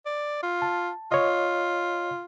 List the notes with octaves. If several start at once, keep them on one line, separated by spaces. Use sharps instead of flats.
D5
F4
A5
F4 C#5 D#5